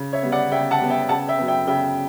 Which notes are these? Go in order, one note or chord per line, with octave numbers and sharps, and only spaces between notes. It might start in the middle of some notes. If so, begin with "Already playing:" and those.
Already playing: C#3
C#5 E5
G3 B3
D5 F#5
C#3 E5 G5
F#5 A5
G3 B3
E5 G5
C#3 F#5 A5
E5 G5
F#3 B3
E5 G5
C#3 E5 G5